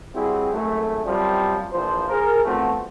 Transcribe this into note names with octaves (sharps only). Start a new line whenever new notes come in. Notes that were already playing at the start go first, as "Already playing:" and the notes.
G3 C4 E4 F#4 G#4
G#1 F#2 A3
F#2 C3 F3 G3
A#1 E3 F3 C5
G#4 A#4
E2 F3 A3 C4 F#4